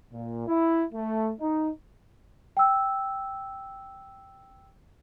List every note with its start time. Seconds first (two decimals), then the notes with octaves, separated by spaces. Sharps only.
0.12 A#2
0.47 E4
0.93 A3
1.39 D#4
2.57 G5 E6